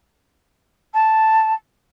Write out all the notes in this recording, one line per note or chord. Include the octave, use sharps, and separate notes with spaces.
A5